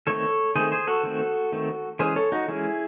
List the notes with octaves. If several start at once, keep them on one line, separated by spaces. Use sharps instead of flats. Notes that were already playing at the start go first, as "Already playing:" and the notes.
D#3 A3 C4 A4 C#5
D#3 A3 C4 G#4 C5
G#4 C5
F#4 A4
D#3 A3 C4
D#3 A3 C4
E3 G#3 C#4 G#4 C5
A4 C#5
D#4 F#4
E3 G#3 C#4 E4 G#4